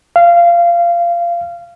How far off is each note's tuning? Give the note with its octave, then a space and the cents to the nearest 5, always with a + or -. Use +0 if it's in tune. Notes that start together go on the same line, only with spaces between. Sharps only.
F5 -20